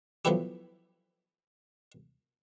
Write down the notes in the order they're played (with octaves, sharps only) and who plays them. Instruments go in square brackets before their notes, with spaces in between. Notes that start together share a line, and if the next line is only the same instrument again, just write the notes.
[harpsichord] F3 F#3 A3 B3 E4 G4